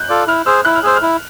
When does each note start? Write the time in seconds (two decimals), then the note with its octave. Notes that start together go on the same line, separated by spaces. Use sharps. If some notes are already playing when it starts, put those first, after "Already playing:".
Already playing: F#6 G6
0.09 F4 A4 D5
0.27 E4 F6
0.46 G#4 C5 E6
0.65 E4 F#6
0.75 F6
0.83 G#4 C5 E6
0.96 F6
1.02 E4